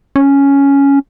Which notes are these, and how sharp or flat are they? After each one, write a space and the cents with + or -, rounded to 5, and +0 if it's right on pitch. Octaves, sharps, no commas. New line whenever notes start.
C#4 +5